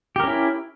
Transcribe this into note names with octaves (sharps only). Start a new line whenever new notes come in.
C#4 E4 G4 A#4